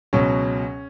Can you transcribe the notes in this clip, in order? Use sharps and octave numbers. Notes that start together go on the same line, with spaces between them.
C#2 B2 F#3 C#4